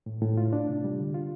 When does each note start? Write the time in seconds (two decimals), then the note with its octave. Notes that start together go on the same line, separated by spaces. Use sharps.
0.06 A2
0.22 A2
0.37 F4
0.53 D4
0.69 C3
0.84 G3
1.00 D3
1.14 F4